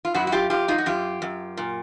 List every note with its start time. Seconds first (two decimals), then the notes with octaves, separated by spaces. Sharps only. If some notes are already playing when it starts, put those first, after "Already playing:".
0.05 F4
0.14 F#2 E4 F#4
0.27 F#4
0.32 F4 G4
0.50 F#2 F4 G4
0.68 D#4 F4
0.78 F#4
0.86 F#2 F4 G4
1.22 F#2
1.57 A#2